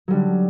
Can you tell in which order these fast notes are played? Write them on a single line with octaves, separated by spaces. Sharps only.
F#3 G3 D3